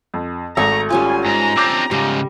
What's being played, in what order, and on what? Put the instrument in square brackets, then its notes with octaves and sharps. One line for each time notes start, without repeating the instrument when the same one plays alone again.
[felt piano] F2
[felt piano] G#1 [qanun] A3 C#6 [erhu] A#5
[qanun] G3 C#4 F4 [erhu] G#5
[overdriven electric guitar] G#2 [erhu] A#5
[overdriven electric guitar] C4 D4 [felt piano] D6 G6 A#6
[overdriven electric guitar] G#2 C#3 [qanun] G3